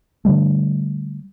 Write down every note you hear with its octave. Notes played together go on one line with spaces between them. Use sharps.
D3 E3 G3 A3